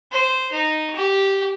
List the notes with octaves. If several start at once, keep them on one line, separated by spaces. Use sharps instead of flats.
C5
D#4
G4